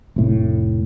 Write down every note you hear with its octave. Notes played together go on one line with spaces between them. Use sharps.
F1 A2